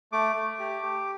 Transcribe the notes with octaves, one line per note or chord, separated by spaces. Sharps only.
A3 D6
A3
G4
G4